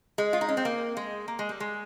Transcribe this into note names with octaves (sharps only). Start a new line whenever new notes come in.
G#3
F4
D#4
C#4
C4
A#3
G#3
A#3
G#3
G3
G#3